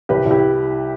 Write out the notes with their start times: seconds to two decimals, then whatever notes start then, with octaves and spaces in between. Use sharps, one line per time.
0.09 C2 G4 B4
0.26 C2
0.31 E4 G4